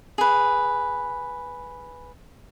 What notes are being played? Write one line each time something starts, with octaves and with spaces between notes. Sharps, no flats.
G#4 B4